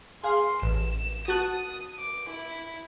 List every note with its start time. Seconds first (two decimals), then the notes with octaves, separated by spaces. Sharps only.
0.24 G#4 F5 C6
0.62 A1 E7
1.28 F#4 A5 D#6 F#6
1.99 D6
2.30 E4